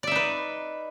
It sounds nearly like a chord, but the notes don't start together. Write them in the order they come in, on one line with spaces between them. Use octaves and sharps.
D5 E5 D#4 B4